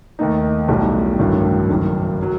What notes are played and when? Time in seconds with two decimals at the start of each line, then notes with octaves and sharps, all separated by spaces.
0.19 D#2 D#3 A3 D#4
0.68 B1 A2 G3 D#4 F#4
1.19 A1 G2 D#3 F#3 A3
1.69 F#1 F#2 D#3
2.23 F#3